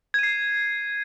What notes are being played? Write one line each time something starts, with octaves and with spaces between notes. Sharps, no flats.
G#6 C7 D#7